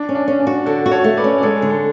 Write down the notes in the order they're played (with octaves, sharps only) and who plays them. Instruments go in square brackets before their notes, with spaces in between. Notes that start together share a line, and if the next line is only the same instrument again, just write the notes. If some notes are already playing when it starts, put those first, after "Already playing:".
Already playing: [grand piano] D4
[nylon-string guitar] C#4
[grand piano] D4
[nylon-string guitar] C#4
[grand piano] D4
[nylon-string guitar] F#4
[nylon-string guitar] D3 [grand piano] F#4 A4
[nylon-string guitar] F#4
[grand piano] A4 C#5
[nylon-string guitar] A3
[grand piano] B4 D5
[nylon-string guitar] C#4
[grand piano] D5
[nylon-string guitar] G#3 [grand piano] A4 C#5
[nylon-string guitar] D3
[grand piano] A4